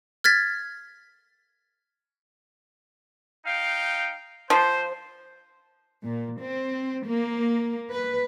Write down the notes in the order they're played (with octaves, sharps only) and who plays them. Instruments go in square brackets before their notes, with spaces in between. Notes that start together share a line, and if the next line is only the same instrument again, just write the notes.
[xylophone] F6 G#6 A6 B6
[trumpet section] D#4 F5 G5
[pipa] F3 [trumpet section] C5
[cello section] A#2
C4
A#3
B4